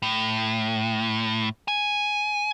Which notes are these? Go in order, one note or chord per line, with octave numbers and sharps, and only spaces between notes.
A2
G#5